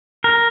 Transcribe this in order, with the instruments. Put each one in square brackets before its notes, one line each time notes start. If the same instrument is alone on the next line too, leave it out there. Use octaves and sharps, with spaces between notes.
[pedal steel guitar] A#4